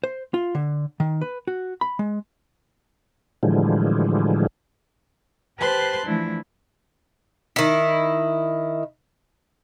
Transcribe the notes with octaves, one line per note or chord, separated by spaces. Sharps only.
C5
F4
D3
D#3
B4
F#4
B5
G#3
A2 D3 E3 F3 G3 G#3
G4 B4 C5 A5 C6 F#6
E3 F3 A3 D4 E4
D#3 E4